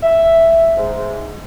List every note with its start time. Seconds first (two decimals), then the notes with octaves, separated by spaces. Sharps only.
0.03 E5
0.77 G#2